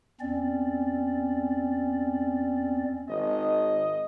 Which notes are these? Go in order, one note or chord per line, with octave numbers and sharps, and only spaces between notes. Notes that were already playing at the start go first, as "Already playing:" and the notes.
E2 C4 C#4 D5
G#1 D#5